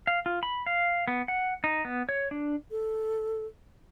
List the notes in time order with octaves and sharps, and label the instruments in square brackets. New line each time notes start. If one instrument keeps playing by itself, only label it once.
[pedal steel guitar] F5
F4
B5
F5
B3
F#5
D#4
B3
C#5
D4
[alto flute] A4